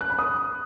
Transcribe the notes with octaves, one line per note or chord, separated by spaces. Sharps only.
F#6
B5
D#6